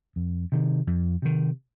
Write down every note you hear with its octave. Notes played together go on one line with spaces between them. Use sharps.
F2
C3 D#3
F2
C3 D#3